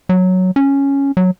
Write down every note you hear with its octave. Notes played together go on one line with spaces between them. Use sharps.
F#3
C#4
F#3